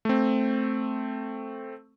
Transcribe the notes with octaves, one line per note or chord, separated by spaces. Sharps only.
A3 C4